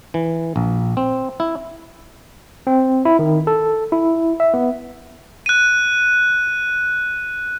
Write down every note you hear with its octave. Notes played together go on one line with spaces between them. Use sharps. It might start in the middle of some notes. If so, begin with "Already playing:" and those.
E3
A#1
C4
E4
C4
E4
D#3
A4
E4
E5
B3
F#6 D#7